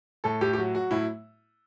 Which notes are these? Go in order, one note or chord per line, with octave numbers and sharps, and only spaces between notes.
A2 A4
A2 G4
G4
F#3 F#4
F#3 F#4
A2 E4